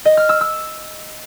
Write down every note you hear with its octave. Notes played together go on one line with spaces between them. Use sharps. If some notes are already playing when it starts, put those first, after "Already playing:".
D#5
F6
E6
E6